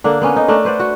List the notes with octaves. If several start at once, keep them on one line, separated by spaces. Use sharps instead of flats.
D3 A#3 D4
A#3 B3 C#4
D#4
A3 D4 A#4
B4 C5 D5 F#5
F#4